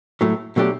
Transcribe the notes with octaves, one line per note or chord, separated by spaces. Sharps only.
A2 F#3 A3
B2 F#3 A3 D4 G4